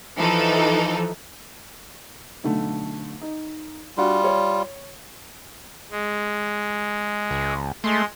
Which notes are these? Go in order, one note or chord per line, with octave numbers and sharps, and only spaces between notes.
E3 F3 D#4 A4
B1 D3 A3
D#4
G3 D4 F4 F#4
C#5
G#3
C#2
G#3 A3 C6